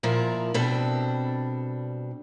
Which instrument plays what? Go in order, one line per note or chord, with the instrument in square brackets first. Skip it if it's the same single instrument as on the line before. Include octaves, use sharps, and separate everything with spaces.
[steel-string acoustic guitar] A#2 F3 E4 A#4
B2 G3 C4 D4 A4